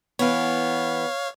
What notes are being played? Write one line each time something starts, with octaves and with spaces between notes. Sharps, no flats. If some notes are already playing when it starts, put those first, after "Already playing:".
E3 B3 C#5 F5